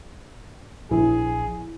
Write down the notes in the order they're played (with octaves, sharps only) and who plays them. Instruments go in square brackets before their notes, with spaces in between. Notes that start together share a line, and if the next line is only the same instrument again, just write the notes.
[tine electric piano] A#1 [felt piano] E4 [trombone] G#4